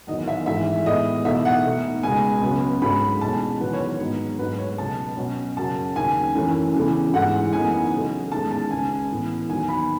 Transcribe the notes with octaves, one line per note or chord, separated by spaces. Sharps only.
E2 D#3 F#3 D#5
E5
G#2 E3 A3 E5
A2 G#3 B3 D#5
E2 B2 A3 D#4 E5
F#5
B2 A3 D#4
C#2 B2 G#3 G#5
C#2 C#3 F#3 B3
G#2 F#3 A3 C#4 B5
E2 B2 G#3 C#4 A5
E2 D#3 F#3 B4
C#5
B4
G#2 F#3 B3 D#4
G#2 F#3 A3 B4
C#5
C#2 B2 F#3 B3 A5
B2 F#3 C#4
F#2 C#3 F#3 A5
D#2 C#3 F#3 G#5
F#2 E3 A3 C#4
E2 C#3 E3 A3
G#2 E3 A3 F#5
F#2 E3 B3 D#4 G#5
C#3 F#3 A3
E2 D#3 G#3 C#4 A5
A5
C#2 C#3 G#3 G#5
A2 E3 B3
D#2 D#3 F#3 B3 G#5
B5